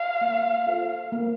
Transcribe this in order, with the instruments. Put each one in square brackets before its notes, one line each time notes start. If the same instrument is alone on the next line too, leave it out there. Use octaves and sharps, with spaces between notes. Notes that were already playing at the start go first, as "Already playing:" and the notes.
Already playing: [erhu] F5
[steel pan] A#3
F4 A4 C5
A#3